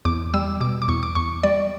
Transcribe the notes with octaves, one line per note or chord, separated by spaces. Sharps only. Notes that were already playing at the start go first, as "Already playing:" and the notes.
E2 D6
G3 E6
B2 D6
D6
E2 C#6
D6
E2 C#6
G3 D5